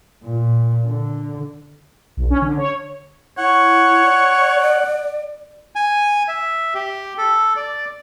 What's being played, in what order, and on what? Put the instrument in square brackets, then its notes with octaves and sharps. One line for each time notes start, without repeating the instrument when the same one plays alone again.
[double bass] A#2
D3
[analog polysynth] B1
C#4
D3
C#5
[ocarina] E4 [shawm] C#5 [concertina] F#5
[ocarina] D5
[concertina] G#5
E5
G4
A4
D5